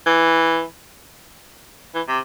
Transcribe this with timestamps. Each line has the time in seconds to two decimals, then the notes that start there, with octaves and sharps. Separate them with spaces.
0.06 E3
1.94 E3
2.08 C3